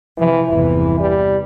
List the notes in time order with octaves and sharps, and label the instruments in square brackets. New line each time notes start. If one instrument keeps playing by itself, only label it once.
[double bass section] C3 F3 [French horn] E3
[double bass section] G1 E2 C3 [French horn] E3
[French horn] G3